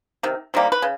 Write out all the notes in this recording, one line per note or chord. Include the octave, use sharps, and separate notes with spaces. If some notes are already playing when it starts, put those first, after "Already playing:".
C3 D#3
C3 D#3 G3 A#3
B4
C#3